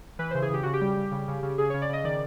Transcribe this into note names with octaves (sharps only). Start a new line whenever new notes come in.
E3 B4
C#3 C5
G#4
C#3 G4
C#3 F#4
G4
G3
G3
C#3
C#3
C#3
C#3 G#4
C#3 C#5
D5
C#3 D#5
D#3 D5